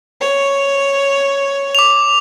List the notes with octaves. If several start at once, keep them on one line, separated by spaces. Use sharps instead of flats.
C#5
D6 F7